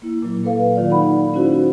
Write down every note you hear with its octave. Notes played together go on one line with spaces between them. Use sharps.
A#3 E4
A#2 F#3
A#3 A4 B4 F5
D#3 F4 D5
D#4 F#5 B5
C#4 D#4 E4 F#4 C5